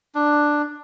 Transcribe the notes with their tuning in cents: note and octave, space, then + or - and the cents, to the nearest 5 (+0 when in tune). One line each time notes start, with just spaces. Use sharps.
D4 +5